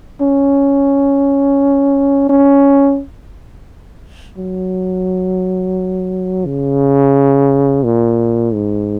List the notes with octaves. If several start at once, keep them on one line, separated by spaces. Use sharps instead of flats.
C#4
C#4
F#3
C#3
A#2
G#2